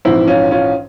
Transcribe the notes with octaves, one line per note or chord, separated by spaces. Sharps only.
A#1 G#2 E3 C4 E4
C#4 F4
C#4 F4